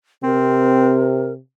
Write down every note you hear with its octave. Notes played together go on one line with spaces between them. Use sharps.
C3 C4 A#4